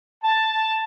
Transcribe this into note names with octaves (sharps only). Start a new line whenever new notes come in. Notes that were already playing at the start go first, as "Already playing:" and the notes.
A5